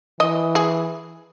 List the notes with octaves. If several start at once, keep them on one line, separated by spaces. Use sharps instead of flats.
E3 D#5
G#4